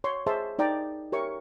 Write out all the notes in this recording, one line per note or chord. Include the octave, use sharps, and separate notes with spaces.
C#5 C6
G#4 C5 D#5 E5 A5 C6
D#4 D5 G5 A#5
G4 A#4 C#5 E5 C#6